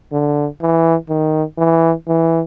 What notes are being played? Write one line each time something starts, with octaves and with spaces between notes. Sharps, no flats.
D3
E3
D#3
E3
E3